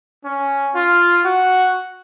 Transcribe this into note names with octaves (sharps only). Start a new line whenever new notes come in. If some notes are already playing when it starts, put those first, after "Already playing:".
C#4
F4
F#4